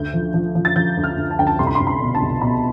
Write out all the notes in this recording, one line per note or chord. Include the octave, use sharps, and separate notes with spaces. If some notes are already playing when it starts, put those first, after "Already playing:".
Already playing: D2 G6
F3
F3
F3
A6
F3 G6
D2
F6
D2
A5
D2 G5
A5
C2 C6
B5
C6
C2
B5
B2
A5
C2
B2 B5